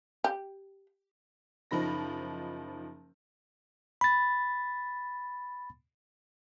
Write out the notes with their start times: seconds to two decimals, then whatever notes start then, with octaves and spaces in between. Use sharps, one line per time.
0.24 G4
1.71 F#1 F3 D#4 B5 A#6
4.01 B5 A6